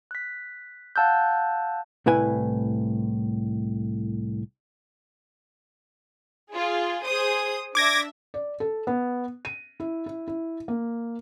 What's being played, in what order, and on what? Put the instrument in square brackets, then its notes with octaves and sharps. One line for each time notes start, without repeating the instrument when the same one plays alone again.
[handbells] F#6 B6
F5 F#5 A5 E6 F#6 G6
[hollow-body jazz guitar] C2 A2 E4 B4 G#5
[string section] F4 G#4
G#4 C5 D#6
[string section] D4 E5 [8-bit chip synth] D6 G#6 A#6
[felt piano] D5
A4
B3
D#7
E4
E4
E4
A#3